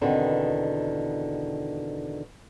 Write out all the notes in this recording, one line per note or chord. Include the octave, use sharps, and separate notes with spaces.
E2 B2 D3 D#3 C4